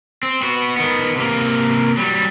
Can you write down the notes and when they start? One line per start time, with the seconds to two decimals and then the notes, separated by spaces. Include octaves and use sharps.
0.23 C4
0.42 B3 F#4
0.77 D#3 B3
1.16 C3 A#3
1.97 F#3 G3